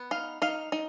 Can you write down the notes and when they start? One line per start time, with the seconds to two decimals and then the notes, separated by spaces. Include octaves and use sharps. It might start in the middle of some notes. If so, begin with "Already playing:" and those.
Already playing: B3
0.11 D#4 F5
0.42 D#4 F5
0.72 D#4